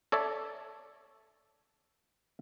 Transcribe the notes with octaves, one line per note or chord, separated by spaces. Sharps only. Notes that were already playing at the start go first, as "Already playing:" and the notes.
A4 C#5 D5 E5 A5